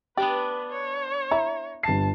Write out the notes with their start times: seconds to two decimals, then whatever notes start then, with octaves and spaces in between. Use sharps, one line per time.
0.17 B3 D4 G4 B4 D5
0.70 C#5
1.31 E4 A#5
1.83 G1 A5 C7